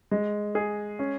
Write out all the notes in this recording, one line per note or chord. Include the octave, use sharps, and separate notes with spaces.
G#3
G#4
C#4